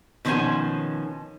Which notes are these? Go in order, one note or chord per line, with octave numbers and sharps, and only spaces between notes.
B2 D#3 F3 C#4 C5 G#5